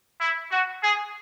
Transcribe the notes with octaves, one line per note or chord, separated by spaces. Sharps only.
E4
F#4
G#4